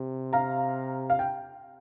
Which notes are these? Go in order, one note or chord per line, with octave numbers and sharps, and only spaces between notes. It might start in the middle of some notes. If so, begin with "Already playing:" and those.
Already playing: C3
F5 A#5
F5
G5